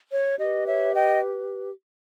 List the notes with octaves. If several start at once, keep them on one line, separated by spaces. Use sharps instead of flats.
C#5
G4 B4 D#5
C#5 E5
D#5 G5